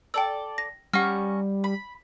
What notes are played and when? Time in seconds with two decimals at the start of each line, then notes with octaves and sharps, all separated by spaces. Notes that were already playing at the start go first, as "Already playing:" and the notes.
0.14 A4 D5 G5 E6
0.58 A#6
0.93 G3 C#4 F#5 A#5 C#6 F6
1.64 B5